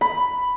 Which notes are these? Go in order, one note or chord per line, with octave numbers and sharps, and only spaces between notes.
B5